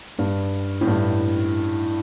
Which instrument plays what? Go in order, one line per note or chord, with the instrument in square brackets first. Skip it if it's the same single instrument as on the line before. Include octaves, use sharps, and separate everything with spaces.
[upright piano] G2
A2
G2